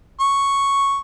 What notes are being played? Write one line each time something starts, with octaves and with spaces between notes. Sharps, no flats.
C#6